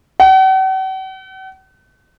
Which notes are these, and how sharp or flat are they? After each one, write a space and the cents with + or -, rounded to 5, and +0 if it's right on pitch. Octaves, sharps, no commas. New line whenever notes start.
F#5 +45